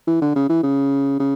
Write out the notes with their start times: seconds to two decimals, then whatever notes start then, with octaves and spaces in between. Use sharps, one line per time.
0.07 E3
0.22 D3
0.35 C#3
0.49 E3
0.63 C#3
1.19 C#3